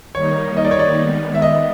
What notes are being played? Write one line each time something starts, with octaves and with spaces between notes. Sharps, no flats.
D#3 G3 A#3 D#4 C#5
D#5
D5
C#5
D5
D#3 G#3 B3
E5
D#5